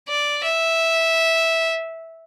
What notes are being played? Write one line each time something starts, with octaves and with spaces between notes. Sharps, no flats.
D5
E5